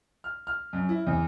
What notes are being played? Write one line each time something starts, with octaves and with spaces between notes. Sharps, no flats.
F6
F6
F#2
E4
E2